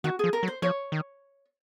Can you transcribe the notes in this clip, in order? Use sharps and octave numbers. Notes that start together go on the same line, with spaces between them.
D#3 F#4
F3 G#4
A#4
F#3
C5
F3 C#5
D#3